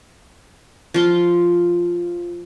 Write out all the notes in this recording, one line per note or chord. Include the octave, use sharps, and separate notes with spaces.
F3 F4 C6